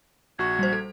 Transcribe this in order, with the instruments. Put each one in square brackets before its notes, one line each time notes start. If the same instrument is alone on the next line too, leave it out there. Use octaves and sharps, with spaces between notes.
[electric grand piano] A#1 F#4 C#6 [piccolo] G#6
[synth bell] G3 C5
A4